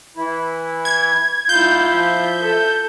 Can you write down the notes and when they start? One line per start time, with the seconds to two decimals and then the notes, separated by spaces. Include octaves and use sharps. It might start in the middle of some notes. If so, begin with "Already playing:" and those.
0.17 E3 E4
0.85 G#6
1.49 G#2 E4 F4 G6
1.92 F3 E5
2.40 A4